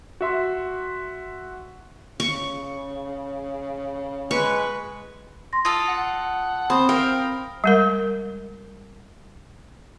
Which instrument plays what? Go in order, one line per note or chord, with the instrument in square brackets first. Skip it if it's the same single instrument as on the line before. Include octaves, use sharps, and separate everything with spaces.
[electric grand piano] F#4 E5 C6
[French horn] C#3 [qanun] C#6
[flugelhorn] G#3 [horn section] B4 [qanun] C#6
[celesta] C6 A#6
[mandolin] F4 A4 [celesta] D#6
[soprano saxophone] F#5
[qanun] C4 [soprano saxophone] C5 [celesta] B5 D#6
[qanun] A#4 [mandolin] F5 [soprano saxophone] G5
[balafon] G3 G#3 A#4